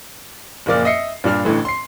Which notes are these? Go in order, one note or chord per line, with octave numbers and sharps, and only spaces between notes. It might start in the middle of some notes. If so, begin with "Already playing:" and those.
F#1 A#2 F3 A#3 D5 F6
D#5 E5 C7 C#7
G2 A#2 D4 F6
A1 A2 D3 E3
C6 C7